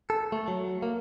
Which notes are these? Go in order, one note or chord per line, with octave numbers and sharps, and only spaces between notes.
A4
A3
F#3
A#3